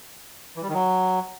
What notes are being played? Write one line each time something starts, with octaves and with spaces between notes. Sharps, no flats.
E3
G3
D#3
F#3